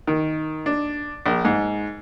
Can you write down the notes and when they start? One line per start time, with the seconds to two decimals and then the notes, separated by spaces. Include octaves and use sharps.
0.07 D#3
0.66 D4
1.26 A#1
1.45 G#2